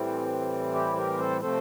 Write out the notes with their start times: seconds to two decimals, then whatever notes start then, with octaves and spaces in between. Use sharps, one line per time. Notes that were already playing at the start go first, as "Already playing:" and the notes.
Already playing: A2 E3 G3 C4
0.74 E4 G4
0.96 G4 A#4
1.19 A4 C5
1.41 C3 F3 A3 C4 A4 C5